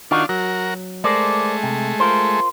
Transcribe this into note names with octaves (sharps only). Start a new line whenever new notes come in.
D#3 D4 D#4 F4 F#4
F#3 F#4 A#4
G#3 A3 A#4 C5 D5
C3
F4 A#4 C5